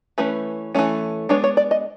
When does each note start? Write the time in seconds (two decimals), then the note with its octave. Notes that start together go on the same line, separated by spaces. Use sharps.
0.18 E3 A3 C#4 B4
0.75 E3 A3 C#4
1.29 G#3 B3 D4 C#5
1.44 C#5
1.57 D5
1.71 D#5